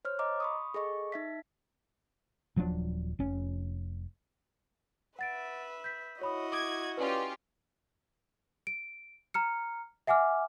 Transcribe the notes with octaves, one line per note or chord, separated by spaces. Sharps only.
C5 C#5 F6
D#5 A#5 D6
B5 C#6 D#6
G#4 A4 D#5 C#6
D#4 E5 B6
D#1 F3 F#3 D4
F1 C#4
B4 E5 F#5 A6 D7
G6 B6
E4 F#4 C#5 D#5 B5 D#6
D6 D#6 G#6 D7
C#4 F4 G4 B4 D5
D7
A#5 F6 C#7
E5 F#5 G#5 D6 F6